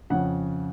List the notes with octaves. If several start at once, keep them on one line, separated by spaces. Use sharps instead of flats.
F2 C#3 F#5